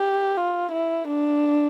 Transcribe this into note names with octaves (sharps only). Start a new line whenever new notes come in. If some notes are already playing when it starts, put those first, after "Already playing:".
Already playing: G4
F4
E4
D4